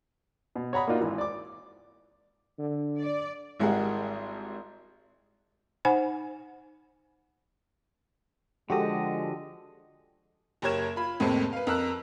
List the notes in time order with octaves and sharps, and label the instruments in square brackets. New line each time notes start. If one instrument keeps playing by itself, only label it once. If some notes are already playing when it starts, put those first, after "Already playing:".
[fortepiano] B2
C#5 F#5 A#5 B5 D#6
A#3 D4 D#4 F4 F#4
G#1 E3
D5 D6
[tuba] D3
[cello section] D5
[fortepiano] G#1 G3 G#3 E4 A#4 F#5
[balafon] D#4 C5 F#5 G#5 B5
[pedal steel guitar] D3 F3 D#5 [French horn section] G#3 [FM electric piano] F#4 G4 A4
[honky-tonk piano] F#1 G4 A#4 C#5 G#6 E7
F4 B5
F2 A2 C3 G#3 A#3 C4
B4 F5
F2 A#4 E6 F#6